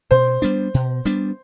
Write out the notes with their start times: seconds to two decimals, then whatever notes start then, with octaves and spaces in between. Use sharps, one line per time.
0.11 B2 C5
0.42 G3 B3 D4
0.74 B2
1.05 G3 B3 D4